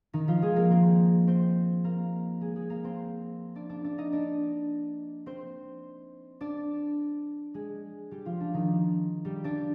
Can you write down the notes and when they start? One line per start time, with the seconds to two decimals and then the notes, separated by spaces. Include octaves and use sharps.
0.13 D#3 D#4
0.28 F3 F4
0.42 G#3 G#4
0.56 A#3 A#4
0.71 C4 C5
1.27 C4 C5
1.84 A#3 A#4
2.41 G#3 G#4
2.56 G#3 G#4
2.70 A#3 A#4
2.84 C4 C5
3.55 D4 D5
3.69 D4 D5
3.84 D4 D5
3.98 D#4 D#5
4.12 D4 D5
5.26 C4 C5
6.41 D4 D5
7.54 G#3 G#4
8.11 G3 G4
8.25 F3 F4
8.40 D4
8.54 D#3 D#4
9.25 G3 G4
9.44 D4 D5